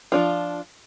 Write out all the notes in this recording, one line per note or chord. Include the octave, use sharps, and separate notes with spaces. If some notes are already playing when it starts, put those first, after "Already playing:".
F3 D4 F4